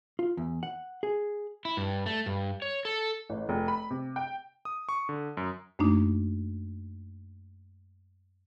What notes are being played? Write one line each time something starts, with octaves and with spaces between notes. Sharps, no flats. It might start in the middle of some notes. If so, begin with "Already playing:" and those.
F4
E2
F#5
G#4
E4
G2
A3
G2
C#5
A4
A1
F1
B5
C3
G5
D#6
C#6
D3
F#2
F#2 A3 A#3 D4 D#4